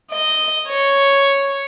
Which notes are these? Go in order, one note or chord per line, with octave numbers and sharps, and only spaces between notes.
D#5
C#5